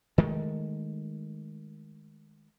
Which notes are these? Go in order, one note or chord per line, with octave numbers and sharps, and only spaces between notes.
D#3 G#3 A3